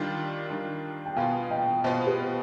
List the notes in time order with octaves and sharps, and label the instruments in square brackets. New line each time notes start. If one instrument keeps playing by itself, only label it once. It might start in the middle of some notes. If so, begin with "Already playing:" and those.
Already playing: [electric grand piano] D#3 G3 D4 F4 [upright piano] D#5 G5
[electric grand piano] D#3 G3 D4 F4
[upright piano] G5
[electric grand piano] B2 B3 F4 [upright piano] F5 G#5
[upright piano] D#5 G5
[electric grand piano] B2 B3 F4 [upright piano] C5 D#5
[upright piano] G4 B4